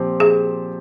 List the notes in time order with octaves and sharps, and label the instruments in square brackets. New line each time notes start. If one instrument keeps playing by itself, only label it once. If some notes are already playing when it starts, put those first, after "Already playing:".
Already playing: [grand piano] A#2 F3 C4 G4
[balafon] G#4